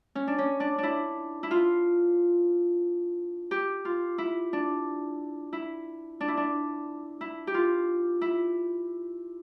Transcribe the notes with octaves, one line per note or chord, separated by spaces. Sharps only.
C#4
D4
C#4
D4
D4 E4
E4
F4
G4
F4
E4
D4
E4
D4
E4
D4
E4
G4
F4
E4